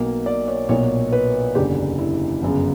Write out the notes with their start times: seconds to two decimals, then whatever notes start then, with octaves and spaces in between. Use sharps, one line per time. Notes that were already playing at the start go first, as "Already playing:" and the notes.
Already playing: B1 B2 A#3
0.26 D5
0.48 C#5
0.69 B1 A#2 A#3 C#5
1.12 B4
1.55 F#1 E2 D3 G4
1.98 E4
2.42 G1 F#2 C#3